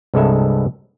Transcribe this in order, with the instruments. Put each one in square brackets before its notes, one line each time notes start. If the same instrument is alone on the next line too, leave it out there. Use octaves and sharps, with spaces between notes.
[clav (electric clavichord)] C2 G2 G#3 A4 E5